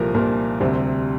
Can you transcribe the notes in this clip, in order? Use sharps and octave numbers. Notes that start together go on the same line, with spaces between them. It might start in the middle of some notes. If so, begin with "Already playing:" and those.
Already playing: C2 A#2 F3 A#3 A4 A#4
C2 A#2 F3 A#3 A#4
D2 C3 G3 C4